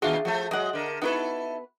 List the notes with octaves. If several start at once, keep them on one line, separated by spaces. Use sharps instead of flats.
D#2 B2 D4 F4 F#4 G#4 E5
F3 A3 F#4 A4
F#3 G#3 D#5 F#5
D3 A#4
B3 D#4 E4 F#4 A4 B4